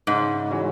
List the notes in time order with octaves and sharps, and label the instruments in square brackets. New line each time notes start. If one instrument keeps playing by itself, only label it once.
[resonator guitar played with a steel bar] G#2 [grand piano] C#3
[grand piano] E3 G#3 C#4 F#4